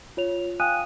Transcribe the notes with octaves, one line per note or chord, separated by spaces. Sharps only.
F4 C#5 F7
F5 G5 G#5 D#6 F#6 D#7